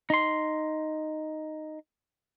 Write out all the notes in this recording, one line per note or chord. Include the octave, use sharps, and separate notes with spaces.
D#4 C6